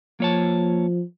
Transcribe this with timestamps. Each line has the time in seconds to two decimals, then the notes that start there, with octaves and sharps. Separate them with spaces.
0.20 F3 A#3 C#5 A5